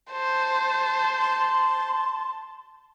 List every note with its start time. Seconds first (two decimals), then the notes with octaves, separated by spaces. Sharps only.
0.11 C5 A5
1.21 C6